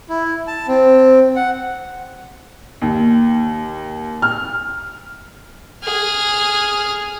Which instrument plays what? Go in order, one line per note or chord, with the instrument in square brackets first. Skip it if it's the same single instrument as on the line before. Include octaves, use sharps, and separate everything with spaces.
[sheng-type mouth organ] E4
A5
C4
F#5
[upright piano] D#2
F6
[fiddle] G#4 F6